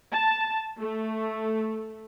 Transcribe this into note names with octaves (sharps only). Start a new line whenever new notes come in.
A5
A3